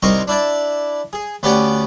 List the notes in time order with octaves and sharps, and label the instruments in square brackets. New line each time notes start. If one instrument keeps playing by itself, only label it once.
[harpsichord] C2 C4 D#4 A#4 A#5 C#6
D4 E4 D5
G#4
D2 B3 C#4 G4 D5